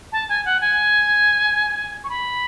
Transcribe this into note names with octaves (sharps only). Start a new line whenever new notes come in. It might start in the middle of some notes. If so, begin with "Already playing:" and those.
A5
G#5
F#5
G#5
C#6
B5